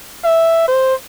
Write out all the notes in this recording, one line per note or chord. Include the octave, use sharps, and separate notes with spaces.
E5
C5